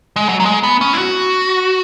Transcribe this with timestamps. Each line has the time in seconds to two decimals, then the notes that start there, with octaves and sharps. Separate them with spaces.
0.16 G#3
0.29 F#3
0.40 F#3
0.45 G#3
0.63 B3
0.81 C#4
0.93 E4
0.98 F#4